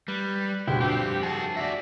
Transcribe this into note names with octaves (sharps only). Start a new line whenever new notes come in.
G3 B4
D2 E4 G4 G5 F#6
G2 F3 C4 G4
F#4 G#4 A5
F#4 D5 E5